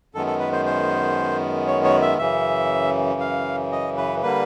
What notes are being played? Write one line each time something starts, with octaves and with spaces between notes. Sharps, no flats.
F#2 D#3 G#3 B3 A4
A4
B4
C5
C5
C#5
C#5
E5
F#2 C#3 E3 E5
F5
D#5
B4
D3 G3 A#3 B4